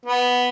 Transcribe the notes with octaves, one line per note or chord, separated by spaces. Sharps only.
B3